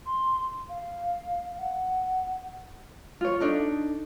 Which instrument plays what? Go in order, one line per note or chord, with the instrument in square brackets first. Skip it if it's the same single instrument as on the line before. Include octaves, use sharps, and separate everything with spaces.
[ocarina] C6
F5
F#5
[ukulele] F4 C#5
D4 D#4 A4